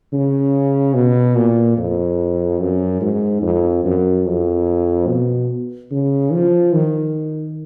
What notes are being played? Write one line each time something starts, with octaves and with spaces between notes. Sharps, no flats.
C#3
B2
A#2
F2
F#2
G#2
F2
F#2
F2
B2
C#3
F3
D#3